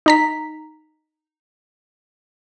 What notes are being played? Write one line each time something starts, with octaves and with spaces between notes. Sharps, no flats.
D#4 A#5 B6